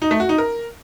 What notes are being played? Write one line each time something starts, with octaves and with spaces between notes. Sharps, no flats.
D#4
A3
F#4
D#4
A#4